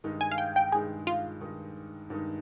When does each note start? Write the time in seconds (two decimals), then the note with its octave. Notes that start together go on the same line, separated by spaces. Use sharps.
0.04 G2 D#3 G#3 D#4
0.21 G#5
0.31 F5
0.38 G5
0.56 G5
0.72 G2 D#3 G#3 D#4 G#4
1.07 F4
1.41 G2 D#3 G#3 D#4
2.10 G2 D#3 G#3 D#4